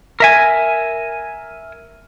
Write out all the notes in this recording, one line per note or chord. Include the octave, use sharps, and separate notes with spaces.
A#4 E5 G#5